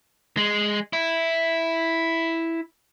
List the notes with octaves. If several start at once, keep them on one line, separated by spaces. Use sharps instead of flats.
G#3
E4